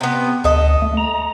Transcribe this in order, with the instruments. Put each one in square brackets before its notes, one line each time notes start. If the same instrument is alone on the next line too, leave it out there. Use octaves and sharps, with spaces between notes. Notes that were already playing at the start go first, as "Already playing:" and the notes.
[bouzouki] C3 B3
[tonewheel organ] D2 [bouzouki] A4 D#5
[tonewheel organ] A3
A#5